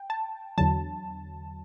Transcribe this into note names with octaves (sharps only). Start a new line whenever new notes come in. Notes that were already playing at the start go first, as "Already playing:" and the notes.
Already playing: G5
A5
E2 D3 F#3 A5